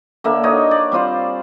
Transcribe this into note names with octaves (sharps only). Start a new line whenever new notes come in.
D3 A#3 E5
D#4 F#4 C#5 D#5
D5
G3 C4 F4 C5